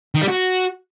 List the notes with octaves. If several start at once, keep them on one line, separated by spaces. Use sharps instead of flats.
D#3
G3
F#4